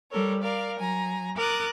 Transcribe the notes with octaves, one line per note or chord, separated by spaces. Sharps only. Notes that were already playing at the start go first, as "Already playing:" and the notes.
G3 A4 A#4 C#5
A#4 D5 F5
F#3 G#5 A#5
A#4 D6 D#6 F#6 A6